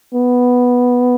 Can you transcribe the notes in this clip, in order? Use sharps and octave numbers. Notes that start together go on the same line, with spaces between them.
B3